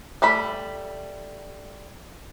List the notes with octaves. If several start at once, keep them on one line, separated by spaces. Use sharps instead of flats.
G3 A3 B5